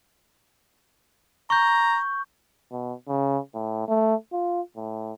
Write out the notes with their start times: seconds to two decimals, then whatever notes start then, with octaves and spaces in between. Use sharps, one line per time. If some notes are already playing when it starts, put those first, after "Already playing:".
1.50 A#5 C#6 G6
2.71 B2
3.07 C#3
3.54 A2
3.87 A3
4.32 F4
4.76 A2